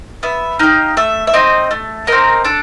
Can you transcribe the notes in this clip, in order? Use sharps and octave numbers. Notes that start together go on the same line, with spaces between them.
B3 E5
D#4 G4 F5
A3 E5
E5
C4 D#4 D#5
A3
C4 D#4 A#4
D4 A4